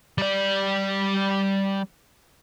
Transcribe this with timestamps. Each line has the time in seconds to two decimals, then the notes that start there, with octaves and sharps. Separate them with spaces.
0.18 G3 D5